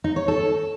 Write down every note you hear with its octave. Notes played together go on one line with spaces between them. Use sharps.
D#4
C#5
A4